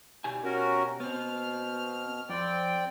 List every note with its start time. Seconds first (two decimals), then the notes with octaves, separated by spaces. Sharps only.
0.24 B2 G4 G#5
0.44 C#4 F#4 A#4
1.00 B2 B3 C4 F6
2.29 F2 C4 D5 G5